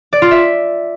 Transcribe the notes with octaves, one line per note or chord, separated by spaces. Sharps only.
D5
F4
E5